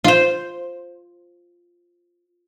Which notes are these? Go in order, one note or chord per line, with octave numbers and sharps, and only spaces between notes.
F4 C5